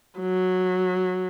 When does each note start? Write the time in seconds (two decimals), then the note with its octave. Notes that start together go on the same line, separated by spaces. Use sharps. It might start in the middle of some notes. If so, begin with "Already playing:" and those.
0.20 F#3